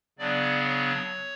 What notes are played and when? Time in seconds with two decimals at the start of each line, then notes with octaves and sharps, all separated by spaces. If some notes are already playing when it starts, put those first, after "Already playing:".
0.19 C#3 F#3 B3 D4 D5
0.65 C#5